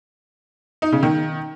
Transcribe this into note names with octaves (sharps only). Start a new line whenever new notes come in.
D#4
C#3
D#3